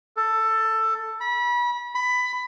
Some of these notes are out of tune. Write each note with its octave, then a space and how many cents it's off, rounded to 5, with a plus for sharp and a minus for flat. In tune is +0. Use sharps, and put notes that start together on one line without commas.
A4 +10
B5 -30
B5 +15